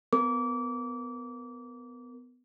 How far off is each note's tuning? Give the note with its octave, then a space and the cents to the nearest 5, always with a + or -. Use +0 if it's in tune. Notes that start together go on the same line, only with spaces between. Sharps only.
B3 +20 A#4 +0 D6 -25